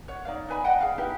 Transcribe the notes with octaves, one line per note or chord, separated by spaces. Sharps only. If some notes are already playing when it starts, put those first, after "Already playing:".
C#5 F#5
D#4 D5 F5
D#4 B4 G#5 B5
D5 D#5 F#5 G5
G#4 F5
D#4 E4 G4 B4